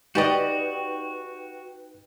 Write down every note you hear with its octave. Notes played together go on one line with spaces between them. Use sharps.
D#4 F#4 G4 B4 D5 D#5 G5